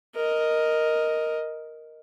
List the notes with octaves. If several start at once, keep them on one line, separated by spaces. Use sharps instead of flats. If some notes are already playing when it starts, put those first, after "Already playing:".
A#4 D#5